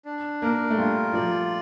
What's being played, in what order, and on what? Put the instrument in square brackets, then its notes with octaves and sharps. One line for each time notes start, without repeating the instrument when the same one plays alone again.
[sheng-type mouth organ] D4
[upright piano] A#3 [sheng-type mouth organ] A#4
[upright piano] A3
[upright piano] G3 [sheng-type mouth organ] F4
[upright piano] F3 [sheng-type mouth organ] D5